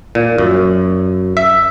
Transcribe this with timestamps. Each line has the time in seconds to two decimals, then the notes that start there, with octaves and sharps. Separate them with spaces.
0.15 A#2
0.38 F#2
1.37 E5